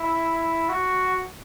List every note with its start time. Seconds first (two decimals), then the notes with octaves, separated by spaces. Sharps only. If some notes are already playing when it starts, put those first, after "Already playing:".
Already playing: E4
0.69 F#4